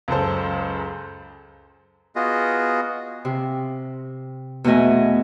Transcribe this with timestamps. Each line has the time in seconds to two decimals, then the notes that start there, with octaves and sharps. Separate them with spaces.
0.08 C#2 F#2 A4 C5
2.16 B3 F4 F#4 G#4 D#5
3.25 C3
4.64 E2 B2 A3 D#5 G#5